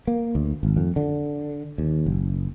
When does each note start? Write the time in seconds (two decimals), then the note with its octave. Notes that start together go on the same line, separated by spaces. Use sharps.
0.07 A#3
0.35 D2
0.63 G#1
0.77 F2
0.96 D3
1.78 D#2
2.06 F#1